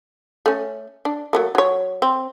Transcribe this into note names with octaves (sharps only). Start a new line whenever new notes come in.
A3 C#4
D4
F#3 A3 A#3
F#3 C#5
C4